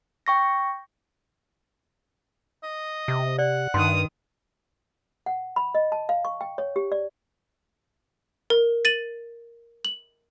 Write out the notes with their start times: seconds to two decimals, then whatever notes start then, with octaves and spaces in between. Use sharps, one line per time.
0.26 G5 C#6 A#6
2.63 D#5
3.08 C3
3.38 D5 F#5
3.74 G2 D#3 C6 D#6
5.26 F#5
5.56 B5
5.75 D#5
5.92 A5
6.09 F5
6.25 C#6
6.41 G5
6.58 C#5
6.76 G4
6.92 D5
8.50 A#4
8.85 A6 D#7 F#7
9.85 F#7